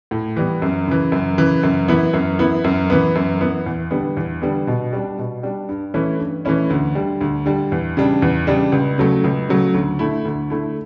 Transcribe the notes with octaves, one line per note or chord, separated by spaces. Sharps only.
A2
E3 G3 B3
F#2
C#3 E3
F#2
C#3 E3
F#2
E3 B3 E4
F#2
E3 B3 E4
F#2
E3 B3
F#2
E3 B3
E2
D3 G3 B3
E2
D3 G3 B3
B2
G3 D4
B2
G3 D4
G2
E3 A3 C#4 E4
G2
E3 A3 C#4 E4
D2
D3 G3
D2
D3 G3
E2
C#3 G3 D4
E2
C#3 G3 D4
C#2
C#3 F#3 A3
C#2
C#3 F#3 A3
D2
D3 A3 E4
D2
D3 A3 E4